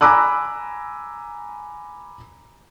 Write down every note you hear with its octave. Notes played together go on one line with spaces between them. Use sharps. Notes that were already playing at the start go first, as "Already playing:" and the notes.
G#5 A#5 B5 D6 E6 F#6